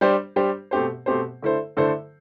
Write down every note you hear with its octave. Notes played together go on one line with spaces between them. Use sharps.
G3 D4 G4 C5
G3 D4 G4 C5
B2 A3 C4 G4 C5
B2 A3 C4 G4 C5
D3 A3 E4 A4 C5
D3 A3 E4 A4 C5